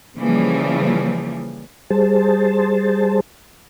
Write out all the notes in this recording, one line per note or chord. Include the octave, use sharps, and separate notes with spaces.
C#3 E3 F3 G3 A#3
G3 G#4 C5 A5